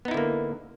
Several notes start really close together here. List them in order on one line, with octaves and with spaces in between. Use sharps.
B3 D#4 E4 D3 A#3